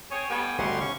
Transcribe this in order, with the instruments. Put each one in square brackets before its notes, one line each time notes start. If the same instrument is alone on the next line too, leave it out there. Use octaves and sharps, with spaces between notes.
[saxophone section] C4 G#4 C#5 [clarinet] G#5
[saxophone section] G3 A3 B3 [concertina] G5
[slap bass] G1 D2 [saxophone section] B2 F#3 [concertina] G4 F#5 C6
[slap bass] D2 C3 [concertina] C#4 C#6